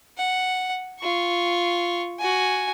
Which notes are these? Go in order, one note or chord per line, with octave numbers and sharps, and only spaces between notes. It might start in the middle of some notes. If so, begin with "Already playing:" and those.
F#5
F4 C#6
F#4 G#5